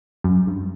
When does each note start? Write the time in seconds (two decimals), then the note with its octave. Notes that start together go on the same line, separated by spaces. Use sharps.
0.24 F#2
0.47 G2